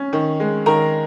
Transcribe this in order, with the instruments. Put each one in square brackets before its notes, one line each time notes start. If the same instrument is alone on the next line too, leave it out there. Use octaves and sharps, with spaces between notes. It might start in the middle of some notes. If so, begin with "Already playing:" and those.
Already playing: [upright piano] C#4
D#3
G#3
D#3 A#4 A#5